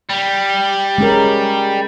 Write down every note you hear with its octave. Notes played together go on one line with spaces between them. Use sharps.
G3
G#3 C#4 A#4